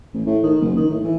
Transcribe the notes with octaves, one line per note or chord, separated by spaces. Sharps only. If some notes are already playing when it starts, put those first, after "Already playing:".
A1
A2
D#3
F#1
D#3
A2
E3